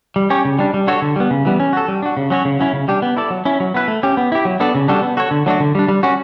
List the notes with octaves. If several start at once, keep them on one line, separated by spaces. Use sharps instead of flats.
G3
C#4 G4 C#5
C#3
G3 D4
G3
D4 F#4 A4 C#5
D3
G3 B3
C#3
E3 G3 B3
C#4
F#4 A4
G3
D4 F#4
C#3
F#3 C#4 F#4 C#5
C#3
F#3 C#4 E4
C#3
G3 D4 G4
B3
E4 A4 D5
F#3
C#4 E4
F#3
B3 E4 B4
A3
C#4 G4
B3
E4 G4
F#3
B3 D4 A4 D5
C#3
G3 D4 F#4 A4
B3
F#4 A4 C#5
D3
F#3 A3 D4 F#4
D3
G3 D4
G3
C#4 F#4